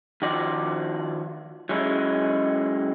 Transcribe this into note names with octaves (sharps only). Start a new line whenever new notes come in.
D#3 F3 F#4 D5
F#3 G#3 C#4 E4